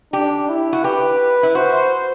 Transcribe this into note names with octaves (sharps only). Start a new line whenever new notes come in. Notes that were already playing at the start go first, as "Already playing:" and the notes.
D4 G4
E4
F#4
G4 B4
E4
F#4 C5